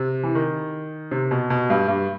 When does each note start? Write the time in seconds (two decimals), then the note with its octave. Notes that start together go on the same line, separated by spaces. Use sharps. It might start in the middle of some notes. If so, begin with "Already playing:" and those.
Already playing: C3
0.23 E3
0.35 D#3
1.11 C3
1.31 B2
1.50 B2
1.70 G2
1.88 G2